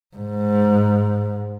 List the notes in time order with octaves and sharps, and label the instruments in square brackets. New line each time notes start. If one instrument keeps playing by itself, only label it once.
[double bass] G#2